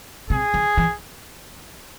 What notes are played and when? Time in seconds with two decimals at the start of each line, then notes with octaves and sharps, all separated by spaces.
0.30 C3 G#4
0.54 D#3
0.77 E3